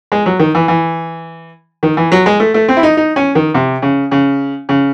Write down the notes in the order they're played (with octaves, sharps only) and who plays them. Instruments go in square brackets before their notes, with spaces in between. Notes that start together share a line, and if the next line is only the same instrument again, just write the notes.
[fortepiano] G#3
F#3
D#3
E3
E3
D#3
E3
F#3
G#3
A3
A3
C4
E4
D#4
D#4
C#4
D#3
C3
C#3
C#3
C#3